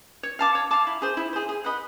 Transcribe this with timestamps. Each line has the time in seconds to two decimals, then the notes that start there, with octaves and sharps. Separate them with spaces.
0.23 C#5
0.39 F5 A5 D6
0.55 C#5
0.71 F5 A5 D6
0.87 E4
1.02 G#4 C5
1.17 E4
1.33 G#4 C5
1.49 G#4
1.64 B4 D#5 F#5